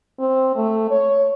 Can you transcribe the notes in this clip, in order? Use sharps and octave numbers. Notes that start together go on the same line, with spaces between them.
C4
A3
C#5